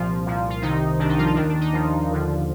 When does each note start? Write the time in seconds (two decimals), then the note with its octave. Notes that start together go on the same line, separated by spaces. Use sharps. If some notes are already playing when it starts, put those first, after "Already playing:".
Already playing: C2 A#2 F3 F4
0.26 C2 A#2 F3
0.50 F4
0.62 C2 C3 D#3 D#4
0.99 C2 C3 D#3 D4
1.09 D#4
1.18 F3 F4
1.27 D#4
1.36 D#2 D#3 D4
1.49 D4
1.61 D#4
1.73 D#2 D#3 F3 F4
2.11 D#2 D3 F3